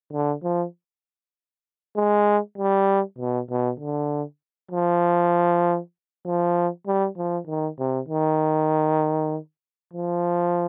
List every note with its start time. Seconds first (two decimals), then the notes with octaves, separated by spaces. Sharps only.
0.13 D3
0.43 F3
1.95 G#3
2.58 G3
3.18 B2
3.50 B2
3.79 D3
4.71 F3
6.25 F3
6.86 G3
7.17 F3
7.47 D#3
7.78 C3
8.08 D#3
9.93 F3